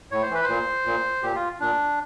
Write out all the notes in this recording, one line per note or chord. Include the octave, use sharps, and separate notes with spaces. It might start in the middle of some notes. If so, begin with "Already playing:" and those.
A2 C#5
C5
E3 B4
A#2 C5
A#2
A#2 G4
F4
A#2 D4